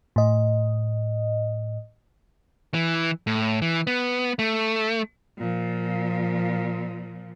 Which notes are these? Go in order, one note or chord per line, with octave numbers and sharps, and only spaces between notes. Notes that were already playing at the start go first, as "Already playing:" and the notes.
A2 D#5
E3
A2
E3
B3
A3
A#2 F3